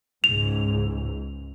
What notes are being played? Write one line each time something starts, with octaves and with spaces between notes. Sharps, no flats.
C#2 G#2 F7